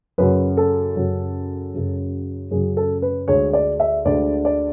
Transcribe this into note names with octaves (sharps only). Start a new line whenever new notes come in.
F#2 C#3 F#3 B4
A4
F#2 C#3 F#3
F#2 C#3 F#3
F#2 C#3 F#3 G#4
A4
B4
D2 D3 G#3 C#5
D5
E5
D2 D3 G#3 D5
D5